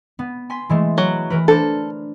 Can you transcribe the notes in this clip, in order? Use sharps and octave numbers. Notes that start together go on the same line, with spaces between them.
B3
G#5 C6 B6
E3 G#3 A3
F#3
E3 A#4 B4
D4 A4 A#4 C5